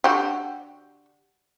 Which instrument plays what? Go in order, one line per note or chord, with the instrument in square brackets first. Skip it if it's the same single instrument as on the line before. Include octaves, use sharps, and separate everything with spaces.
[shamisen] D3 F#4 G4